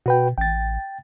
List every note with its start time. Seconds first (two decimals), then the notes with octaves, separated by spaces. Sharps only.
0.06 B2 F#4 B4 G5
0.38 A1 G5 A6